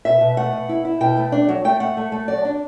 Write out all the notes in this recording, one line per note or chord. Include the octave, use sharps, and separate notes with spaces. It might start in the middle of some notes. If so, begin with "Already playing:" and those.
B2 E5
B2
A3 F#5
B2
E4
E4
B2 G5
A3
D4
F#3
A3 G5
A3 F#5
A3
A3
F#3 D5
D4